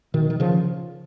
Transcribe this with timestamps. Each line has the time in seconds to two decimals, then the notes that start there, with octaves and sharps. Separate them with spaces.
0.14 B2 D#3
0.30 D#3
0.40 C#3 F3